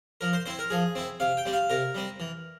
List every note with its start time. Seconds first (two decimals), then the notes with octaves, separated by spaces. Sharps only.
0.21 F3 A#4
0.33 C5
0.46 C4 E4 C5
0.59 A#4
0.70 F3 G#4
0.95 C4 E4
1.20 C3 F5
1.37 G5
1.46 G3 C4
1.53 F5
1.70 C3 A#4
1.95 G3 C4
2.20 E3